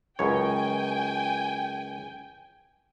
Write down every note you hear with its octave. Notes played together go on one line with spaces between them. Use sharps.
C#2 F#2 C#5 G5 G#5